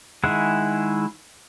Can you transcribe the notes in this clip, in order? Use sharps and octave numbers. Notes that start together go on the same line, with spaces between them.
D#3 G#3 E4 G#4 F#5